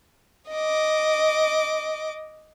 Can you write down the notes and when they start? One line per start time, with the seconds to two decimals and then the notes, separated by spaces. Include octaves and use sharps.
0.50 D#5 D6